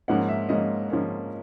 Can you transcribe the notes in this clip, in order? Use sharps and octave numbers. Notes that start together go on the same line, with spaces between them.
G#2 F3 A#3 C#4 F#5
E5
G#2 F3 A#3 C#4 D#5
G#2 F3 A#3 C#4